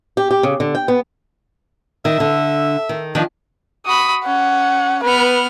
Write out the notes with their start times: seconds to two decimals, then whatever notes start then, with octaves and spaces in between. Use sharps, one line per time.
0.17 G4
0.31 G4
0.43 C#3
0.60 D3
0.75 G5
0.88 B3
2.05 D#3 E5
2.20 D3
2.89 D#3
3.15 D#3 F3 D4
3.86 F#4 B5 D#6
4.25 C#4 F#5
5.04 B3 B4 F6